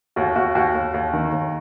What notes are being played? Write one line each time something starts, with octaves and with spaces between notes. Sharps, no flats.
D#2 F#4
D#2 F#4
D#2 F#4
D#2
D#2
D#3
D#2